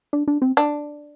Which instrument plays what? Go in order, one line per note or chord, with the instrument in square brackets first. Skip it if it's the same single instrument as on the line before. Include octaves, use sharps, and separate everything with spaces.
[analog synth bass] D4
D4
C4
[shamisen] D4